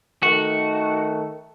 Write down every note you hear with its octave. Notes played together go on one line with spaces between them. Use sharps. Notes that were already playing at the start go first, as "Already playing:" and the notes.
D#3 A3 F#4